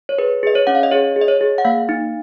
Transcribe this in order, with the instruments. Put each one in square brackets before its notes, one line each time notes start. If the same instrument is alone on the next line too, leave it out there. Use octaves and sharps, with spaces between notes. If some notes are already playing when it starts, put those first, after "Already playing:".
[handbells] C#5
G#4 B4
G#4 D#5
C#5
C#4 F#5
F5
D#5
G#4 C#5
G#4
D#5
C#5
G#4
F#5
A#3 F5
D#4